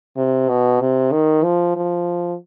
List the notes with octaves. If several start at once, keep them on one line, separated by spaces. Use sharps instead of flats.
C3
B2
C3
D#3
F3
F3